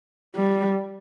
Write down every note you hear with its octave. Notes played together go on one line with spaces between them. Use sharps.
G3